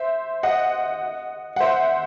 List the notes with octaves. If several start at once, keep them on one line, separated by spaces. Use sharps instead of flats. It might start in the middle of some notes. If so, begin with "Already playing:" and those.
Already playing: C5 E5
D#5 F#5
F#5
C5 E5